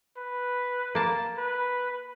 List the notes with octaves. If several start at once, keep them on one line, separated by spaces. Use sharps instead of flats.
B4
A#3 A5
B4